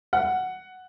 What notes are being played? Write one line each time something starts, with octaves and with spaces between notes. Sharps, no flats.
F#5